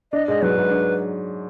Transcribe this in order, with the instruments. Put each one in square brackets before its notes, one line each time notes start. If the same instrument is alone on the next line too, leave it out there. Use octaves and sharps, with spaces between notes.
[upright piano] D4 [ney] D#5
[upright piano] G#2 [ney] D#5
[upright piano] F#3 [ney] B4
[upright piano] G#2
D4